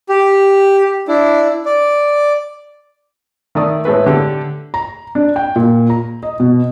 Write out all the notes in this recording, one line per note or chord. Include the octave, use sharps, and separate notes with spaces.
G4
D4 E4
D5
D#3 A3 D5 D#6
A2 G#3 A3 B4
D3 G4 A4
A#5
D4
G5
A#2
A#5
D#5
B2